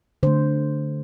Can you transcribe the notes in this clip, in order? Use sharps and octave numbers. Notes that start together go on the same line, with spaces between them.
D3 A3 C5